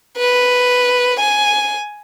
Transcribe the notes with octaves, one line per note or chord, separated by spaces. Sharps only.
B4
G#5